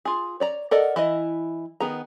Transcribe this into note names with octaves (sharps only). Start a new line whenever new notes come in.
F4 G#4
C#5 D5 A#5
A4 A#4 D5 D#5 F#5
E3 E4 D#5
D#3 B3 G#4 A#5